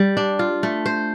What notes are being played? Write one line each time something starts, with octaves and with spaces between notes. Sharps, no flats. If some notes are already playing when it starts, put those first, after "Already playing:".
Already playing: G3
D4
F4
A3
C5